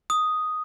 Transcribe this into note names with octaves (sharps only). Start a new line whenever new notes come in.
D#6